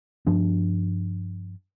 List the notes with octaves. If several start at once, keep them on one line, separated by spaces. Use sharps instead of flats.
G2 F3 D4